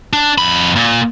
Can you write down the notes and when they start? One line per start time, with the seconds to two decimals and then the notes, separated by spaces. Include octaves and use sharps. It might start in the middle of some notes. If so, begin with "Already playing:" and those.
0.13 D4
0.38 F2 B5
0.76 A#2